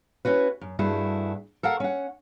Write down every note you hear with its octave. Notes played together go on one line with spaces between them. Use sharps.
C#4 E4 F#4 B4
F#2
G2 A3 E4 F#4 G#4
A4 A#4 F5 F#5
C#4 F#5